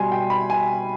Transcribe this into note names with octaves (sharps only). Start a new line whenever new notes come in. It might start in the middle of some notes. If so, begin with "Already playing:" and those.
Already playing: B2 G3 G#5 C6
G5
B5
G#5